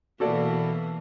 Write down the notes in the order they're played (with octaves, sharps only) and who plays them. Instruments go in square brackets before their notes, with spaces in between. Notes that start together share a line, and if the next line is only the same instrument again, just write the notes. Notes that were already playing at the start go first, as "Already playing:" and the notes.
[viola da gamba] B2 E3 A#3 [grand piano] F#4 A4 D5